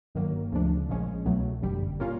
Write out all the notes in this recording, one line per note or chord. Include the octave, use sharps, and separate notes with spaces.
G1 G2 D#3 F#3 A#3
D2 C#3 F3 A3 D4
A#1 A#2 F3 G#3 C#4
C2 B2 F#3 A3
G1 F#2 D3 G3
A#2 G3 A#3 C#4 F4